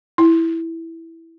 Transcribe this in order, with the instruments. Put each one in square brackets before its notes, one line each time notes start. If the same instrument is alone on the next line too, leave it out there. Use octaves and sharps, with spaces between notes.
[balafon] E4